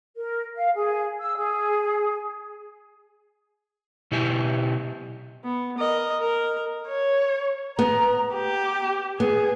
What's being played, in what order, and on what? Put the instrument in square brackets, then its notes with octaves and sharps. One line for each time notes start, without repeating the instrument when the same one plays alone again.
[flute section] A#4
F5
G#4
E6
G#4
[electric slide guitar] B2 E4 G4 G#5
[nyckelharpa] B3
A#4 D#5
A#4
[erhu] C#5
[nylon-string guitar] B3 [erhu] A#5
[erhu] G4
[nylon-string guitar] B3 [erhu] G#4